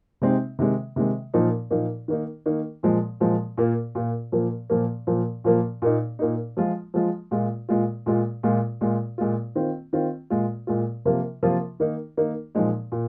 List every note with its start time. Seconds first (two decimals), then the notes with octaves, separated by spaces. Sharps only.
0.22 C3 G#3 C4 D#4
0.59 C3 D#3 G#3
0.96 C3 D#3 G#3
1.34 A#2 F3 A#3 D#4
1.71 A#2 F3 A#3 D#4
2.08 D#3 A#3 D#4
2.46 D#3 A#3 D#4
2.83 A#2 F3 G#3
3.20 A#2 F3 G#3
3.58 A#2 A#3 F4
3.95 A#2 A#3 F4
4.32 A#2 F3 A#3
4.70 A#2 F3 A#3
5.07 A#2 F3 A#3
5.44 A#2 F3 A#3
5.82 A#2 A#3 D#4
6.19 A#2 A#3 D#4
6.57 F3 G#3 F4
6.94 F3 G#3 F4
7.31 A#2 G#3 F4
7.69 A#2 G#3 F4
8.06 A#2 G#3 F4
8.43 A#2 G#3 F4
8.81 A#2 G#3 F4
9.18 A#2 G#3 F4
9.55 D#3 C4 F4
9.93 D#3 C4 F4
10.30 A#2 G#3 F4
10.67 A#2 G#3 F4
11.05 C3 F3 A#3 F4
11.43 C3 F3 A#3 F4
11.80 D#3 A#3 D#4
12.17 D#3 A#3 D#4
12.55 A#2 F3 G#3 D#4
12.92 A#2